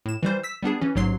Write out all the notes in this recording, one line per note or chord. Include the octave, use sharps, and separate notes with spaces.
A2 E7
E3 G3 C5
E6 B6
G3 B3 D4 G#4
E3 C#4
A1 G#2 F#3 C6 C7